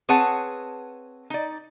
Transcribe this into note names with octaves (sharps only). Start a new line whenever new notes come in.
C4 G#4 B4 C#5 F#5 A5
D#4 D5